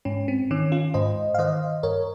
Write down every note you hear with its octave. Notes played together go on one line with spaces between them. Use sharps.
G#2 C#4
C4
D#3 C#4
C#4 F4
G#2 C5 D#5
F5
D#3 C5 D#5
G2 A#4 C#5